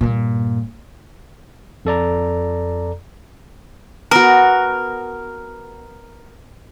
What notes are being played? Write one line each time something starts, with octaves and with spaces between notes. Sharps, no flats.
G2 A#2
F2 A4 D5 A#5
B3 F#4 A#4